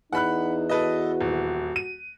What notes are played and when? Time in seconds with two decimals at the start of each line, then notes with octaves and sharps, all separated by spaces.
0.13 E2 D#4 F#5 B5 F#6
0.69 F#4 A4 B4 D#5
1.21 D#1
1.76 D#7